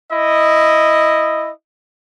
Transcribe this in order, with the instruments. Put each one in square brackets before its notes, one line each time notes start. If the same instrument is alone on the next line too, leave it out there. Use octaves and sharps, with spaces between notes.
[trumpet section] E4 D#5